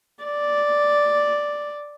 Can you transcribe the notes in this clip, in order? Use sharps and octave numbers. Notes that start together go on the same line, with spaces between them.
D5